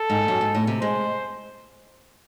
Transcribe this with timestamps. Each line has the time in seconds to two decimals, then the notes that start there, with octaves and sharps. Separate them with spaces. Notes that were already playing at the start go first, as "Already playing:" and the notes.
Already playing: A4
0.10 G#2
0.28 F#2
0.41 G#2
0.55 A2
0.67 C3
0.81 G#3 C5